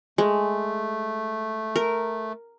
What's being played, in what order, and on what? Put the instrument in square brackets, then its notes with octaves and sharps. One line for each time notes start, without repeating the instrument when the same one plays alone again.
[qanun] G#3 [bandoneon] A3
[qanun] A#4